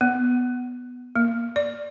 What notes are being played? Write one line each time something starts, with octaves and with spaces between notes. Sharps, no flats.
B3
A#3
D5